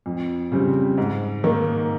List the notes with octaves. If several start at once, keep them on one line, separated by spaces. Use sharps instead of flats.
F2
C#3 G3 C4
G#2
D#3 A#3